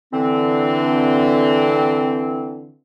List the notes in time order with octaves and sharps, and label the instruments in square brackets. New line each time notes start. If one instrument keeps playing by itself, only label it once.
[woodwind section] D3 E3 C4